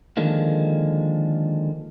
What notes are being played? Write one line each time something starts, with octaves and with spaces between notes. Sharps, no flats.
D3 D#3 F3 G#3 A#3